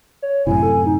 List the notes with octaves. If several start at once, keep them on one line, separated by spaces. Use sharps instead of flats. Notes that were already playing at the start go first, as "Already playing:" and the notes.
C#5
F#2 A2 C3 E4 G#5
A4
D#4